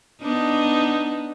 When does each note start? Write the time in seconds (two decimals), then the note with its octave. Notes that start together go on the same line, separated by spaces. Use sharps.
0.22 B3 D4 D#4